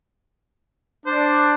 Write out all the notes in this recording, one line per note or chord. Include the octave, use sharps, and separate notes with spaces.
D4 C5